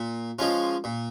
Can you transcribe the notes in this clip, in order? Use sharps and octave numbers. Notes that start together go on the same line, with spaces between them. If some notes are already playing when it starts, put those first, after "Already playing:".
Already playing: A#2
F3 G#3 C#4 F4
A#2